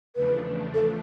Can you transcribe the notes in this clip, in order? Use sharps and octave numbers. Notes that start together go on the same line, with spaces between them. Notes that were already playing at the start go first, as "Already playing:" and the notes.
E2 C#3 F3 A3 D4 B4
A4